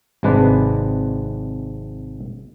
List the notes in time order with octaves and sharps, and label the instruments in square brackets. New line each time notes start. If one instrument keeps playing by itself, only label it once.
[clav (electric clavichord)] G#1 C3 G#3 D4 B4 D5